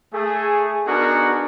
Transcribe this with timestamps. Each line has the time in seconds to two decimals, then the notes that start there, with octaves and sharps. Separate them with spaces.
0.14 A3 G#4
0.87 B3 D4 D#4 F#4 G#4 A#4